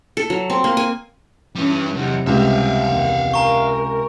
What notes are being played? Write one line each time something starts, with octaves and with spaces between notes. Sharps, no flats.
A4
F#3
C4
A#3
G#5
E3 G3 C#4 B4
E2 C3 F#3 D#4
C#2 C3 G3 E5 F5
E2 D#3 A#3
A#4 G#5 A#5 C#6